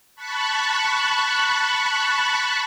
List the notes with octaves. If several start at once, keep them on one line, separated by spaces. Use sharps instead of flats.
A5 B5 C#6 F#6